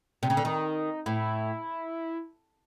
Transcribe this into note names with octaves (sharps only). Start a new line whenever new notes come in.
C3
C#3
D3
D#3 D#4
A2 E4